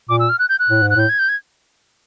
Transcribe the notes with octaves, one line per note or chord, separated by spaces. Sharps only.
A#2 D6
E6
F6
F#6
G6
F#6
A2
G#2
F#6
A2 G6
G#6
G6
G#6